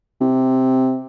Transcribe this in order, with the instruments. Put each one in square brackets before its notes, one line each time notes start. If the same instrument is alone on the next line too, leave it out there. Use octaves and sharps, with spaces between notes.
[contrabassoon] C3